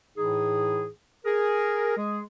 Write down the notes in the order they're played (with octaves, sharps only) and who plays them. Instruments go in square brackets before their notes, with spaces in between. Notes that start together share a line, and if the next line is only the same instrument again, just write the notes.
[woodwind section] A2 E3 D#4 G#4
G#4 A#4
G#3 G#4